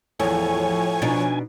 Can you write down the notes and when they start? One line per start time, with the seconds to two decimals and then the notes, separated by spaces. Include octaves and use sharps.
0.20 E2 A2 F3 C#5 G#5
1.02 B2 D4 D#4